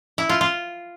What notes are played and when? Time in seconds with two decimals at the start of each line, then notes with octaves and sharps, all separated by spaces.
0.18 E4
0.29 F4
0.41 F4